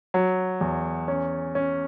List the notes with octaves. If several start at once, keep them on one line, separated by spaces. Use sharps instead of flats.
F#3
E2
C#4
C#4